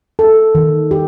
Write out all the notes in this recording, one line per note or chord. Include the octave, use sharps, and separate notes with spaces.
A4
D#3
G4